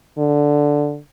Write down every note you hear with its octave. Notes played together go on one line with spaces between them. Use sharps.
D3